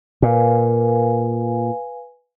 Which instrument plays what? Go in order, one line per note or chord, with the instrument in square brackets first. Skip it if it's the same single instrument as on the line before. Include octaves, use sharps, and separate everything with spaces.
[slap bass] A#2 [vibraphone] B4 F5 G#5